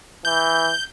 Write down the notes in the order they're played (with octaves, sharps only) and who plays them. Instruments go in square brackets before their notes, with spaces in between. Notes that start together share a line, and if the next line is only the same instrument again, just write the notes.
[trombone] E3 [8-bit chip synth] G6